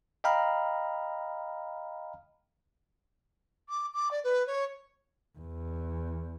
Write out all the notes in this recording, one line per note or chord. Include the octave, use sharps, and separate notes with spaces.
D#5 F5 G5 A#5 B5 F6
D6
D6
D5
B4
C#5
E2